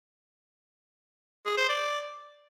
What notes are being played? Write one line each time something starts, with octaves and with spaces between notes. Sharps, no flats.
G#4
C5
D5